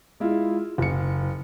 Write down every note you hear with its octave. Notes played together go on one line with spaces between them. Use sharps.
G#3 E4 F4
F#1 C#7